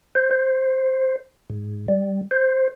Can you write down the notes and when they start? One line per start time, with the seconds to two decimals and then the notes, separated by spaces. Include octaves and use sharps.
0.15 C5
0.31 C5
1.50 G#2
1.88 G3
2.31 C5